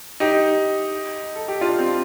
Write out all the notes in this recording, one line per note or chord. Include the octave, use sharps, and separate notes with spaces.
D#4 G4
A4
G4
D4 F4
C4